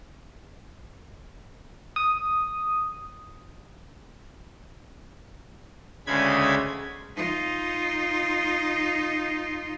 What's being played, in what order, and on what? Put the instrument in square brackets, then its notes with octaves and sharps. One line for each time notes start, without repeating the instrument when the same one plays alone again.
[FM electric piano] D#6
[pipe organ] D2 C#3 G#3 B5 G#6
[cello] D#4 F4